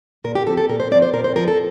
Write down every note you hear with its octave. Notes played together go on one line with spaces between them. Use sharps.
A#2 A#4
G4
F3 C4 A4
A4
A#2 A#4
C5
F3 C4 D5
C5
A#2 A#4
C5
F3 C4 A#4
A4